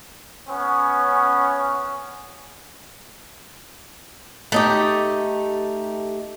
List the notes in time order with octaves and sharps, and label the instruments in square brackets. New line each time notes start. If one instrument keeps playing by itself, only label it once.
[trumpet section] B3 C#4
[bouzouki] A3 D#4 G4